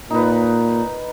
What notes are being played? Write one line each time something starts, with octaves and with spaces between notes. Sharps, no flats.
A#2 D#4 B4